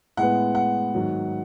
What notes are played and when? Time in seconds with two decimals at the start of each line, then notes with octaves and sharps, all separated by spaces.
0.17 A2 G#3 B3 F#5
0.55 F#5
0.94 G#2 D#3 F#3